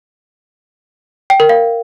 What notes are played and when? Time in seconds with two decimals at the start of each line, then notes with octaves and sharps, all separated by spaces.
1.30 G5
1.40 A#4
1.49 F5